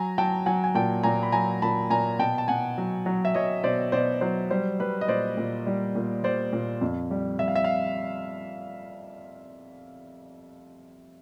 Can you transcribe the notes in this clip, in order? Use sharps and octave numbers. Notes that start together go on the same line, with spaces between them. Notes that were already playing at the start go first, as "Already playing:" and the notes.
Already playing: F#3 G#5 A#5
F#3 G5 A5
F#3 F#5 G#5
G#5
A#2 G5 A5
A#2 G#5 A#5
B5
F#3 G#5 A#5
A#2 A5 B5
A#2 G#5 A#5
B2 G5 A5
A5
B2 F#5 G#5
F#3
F#3
E5
F#3 C#5 D#5
B2 C5 D5
B2 C5 D5
F#3 C5
G3 C5
G3 B4
D#5
A#2 C5 D5
A#2
G3
A#2
G3 C5 D5
A#2
F2
G3
G3 E5
F5
E5
F5